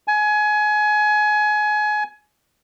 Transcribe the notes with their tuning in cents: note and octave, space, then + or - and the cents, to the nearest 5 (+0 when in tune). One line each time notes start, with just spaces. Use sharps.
G#5 +25